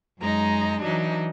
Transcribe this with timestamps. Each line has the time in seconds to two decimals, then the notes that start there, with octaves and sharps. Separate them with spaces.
0.20 F#2 G#3 D#4 A#5
0.82 E3 F#3 D4 D#4